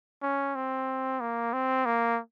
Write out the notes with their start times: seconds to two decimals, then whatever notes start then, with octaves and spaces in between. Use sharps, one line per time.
0.22 C#4
0.55 C4
1.20 A#3
1.53 C4
1.85 A#3